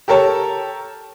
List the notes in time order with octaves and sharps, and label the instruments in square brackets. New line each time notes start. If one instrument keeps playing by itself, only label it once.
[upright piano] G4 A4 A#4 C#5 A5